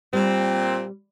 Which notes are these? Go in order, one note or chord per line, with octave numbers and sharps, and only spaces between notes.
A#2 G3 C4